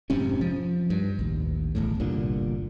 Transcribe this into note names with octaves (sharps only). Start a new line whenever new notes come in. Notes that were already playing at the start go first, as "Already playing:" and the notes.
F1 G#2 C3 C#4
F3
G2
A1 D#2
D1 E2 A2
G1 C2 A#2 D3